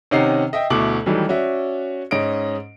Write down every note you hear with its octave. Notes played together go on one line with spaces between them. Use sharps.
C3 D#3 C#4 D#4 F#5 C7
D#5 E5 G5
D2 B2 E4 D6 F#7
D#3 E3 F#3 G3 A3
C#4 F#4 D5 E5
G#2 C#4 D#5 D7